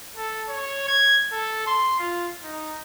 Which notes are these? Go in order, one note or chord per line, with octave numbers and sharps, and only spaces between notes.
A4
C#5
G#6
A4
C6
F4
D#4